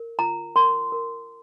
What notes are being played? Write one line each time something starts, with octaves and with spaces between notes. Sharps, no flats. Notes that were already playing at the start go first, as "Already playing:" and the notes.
Already playing: A#4
F4 A#5
A#4 C6
A#4